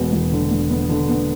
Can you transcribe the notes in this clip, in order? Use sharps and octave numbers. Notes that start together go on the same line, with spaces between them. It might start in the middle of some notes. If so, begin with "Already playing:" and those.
Already playing: E1 B3
E1
D3
E1
B3
D3
B3